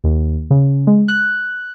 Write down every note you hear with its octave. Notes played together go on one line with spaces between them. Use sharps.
D#2
C#3
G#3
F#6